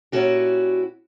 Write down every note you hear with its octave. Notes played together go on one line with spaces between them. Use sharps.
A#2 C#4 E4 F#4 G4